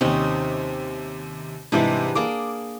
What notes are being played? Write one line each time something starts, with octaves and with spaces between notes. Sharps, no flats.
D#2 C3 C4 C#4 D#4
G#2 C3 E3 G3 D4 D#4
A#3 G#4 D5 D6